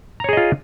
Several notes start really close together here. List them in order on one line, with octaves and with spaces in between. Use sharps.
A#5 C#5 G#4 D#5 F4